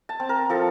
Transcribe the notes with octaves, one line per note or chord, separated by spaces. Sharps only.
A5
C4
A#4
F3 A4